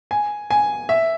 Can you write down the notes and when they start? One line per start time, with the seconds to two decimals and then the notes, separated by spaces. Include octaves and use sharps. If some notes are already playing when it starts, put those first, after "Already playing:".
0.11 G#5
0.50 G#5
0.89 E5